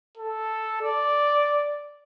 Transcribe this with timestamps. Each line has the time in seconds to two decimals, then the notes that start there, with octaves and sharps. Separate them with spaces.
0.18 A4
0.82 D5